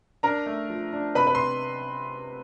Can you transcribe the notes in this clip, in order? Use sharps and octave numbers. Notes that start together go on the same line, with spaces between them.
D4 A#4 A#5
A3
F3
D4
C3 B4 B5
B4 B5
C6